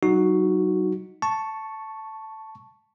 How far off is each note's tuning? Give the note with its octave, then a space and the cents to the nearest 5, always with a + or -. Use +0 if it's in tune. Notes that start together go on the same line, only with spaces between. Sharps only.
F#3 +25 D#4 +0 F#4 +0
A5 +0 C#6 +0